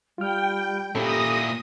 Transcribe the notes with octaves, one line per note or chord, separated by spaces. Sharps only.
G3 F4 G5 F6
A#2 C#4 E4 G4 A4 D#6 A#6